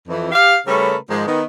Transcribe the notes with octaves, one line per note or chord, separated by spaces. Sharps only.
F2 E3
G4 F5
C#3 G3 A3 C#4 A#4 B4
G#2 D#3 F3 G#3
D#3 B3